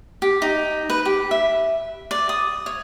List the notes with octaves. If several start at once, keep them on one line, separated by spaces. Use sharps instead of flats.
G4
D#4
B4
G4
E5
D5
D#6
C#5